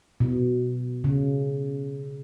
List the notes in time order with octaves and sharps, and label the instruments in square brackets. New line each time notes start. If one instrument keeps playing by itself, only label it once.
[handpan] B2
C#3